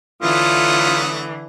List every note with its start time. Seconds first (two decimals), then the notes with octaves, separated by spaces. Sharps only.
0.22 D3 E3 F#3 A3 F4 D#6